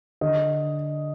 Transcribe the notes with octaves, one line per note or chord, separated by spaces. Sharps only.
D3 D#5